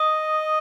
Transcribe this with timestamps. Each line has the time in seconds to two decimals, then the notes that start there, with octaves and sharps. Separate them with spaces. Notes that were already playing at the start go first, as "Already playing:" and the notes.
Already playing: D#5 D#6